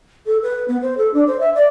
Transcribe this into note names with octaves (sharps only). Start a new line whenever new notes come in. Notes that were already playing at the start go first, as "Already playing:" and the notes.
A4
B4
B3
C5
A4
D4
C5
E5
D5